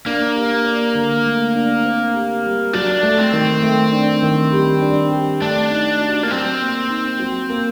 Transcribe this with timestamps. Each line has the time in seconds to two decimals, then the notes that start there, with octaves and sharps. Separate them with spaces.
0.06 A#3 D4
0.35 G4
0.65 D5
0.95 D3
1.25 A3
1.55 D4
1.85 C4
2.14 G4
2.44 G3
2.73 F#3 D4
3.03 A3
3.18 C4
3.33 D#3
3.63 A3
3.92 D4
4.23 D#3
4.51 G3
4.82 D4
5.12 G4
5.41 A3 D4
5.70 D#4
6.00 F#4
6.23 A#3
6.31 F#3 C4
6.61 A#3
6.89 D#4
7.20 F#3
7.50 A#3